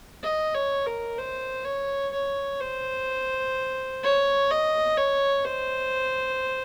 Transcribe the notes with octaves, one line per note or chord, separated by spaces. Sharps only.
D#5
C#5
A#4
C5
C#5
C#5
C5
C#5
D#5
C#5
C5